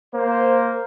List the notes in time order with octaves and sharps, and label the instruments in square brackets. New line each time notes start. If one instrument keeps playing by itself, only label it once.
[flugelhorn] A#3 [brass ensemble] C5